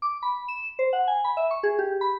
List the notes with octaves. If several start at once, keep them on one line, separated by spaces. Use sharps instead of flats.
D6
B5
E7
C5
F#5
G#5
B5
E5
C#6
G#4
G4
B5